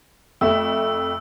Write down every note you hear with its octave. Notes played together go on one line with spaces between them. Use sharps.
F2 A3 E5 E6